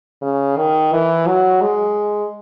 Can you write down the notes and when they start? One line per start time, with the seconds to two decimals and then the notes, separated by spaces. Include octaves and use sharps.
0.22 C#3
0.57 D#3
0.92 E3
1.27 F#3
1.61 G#3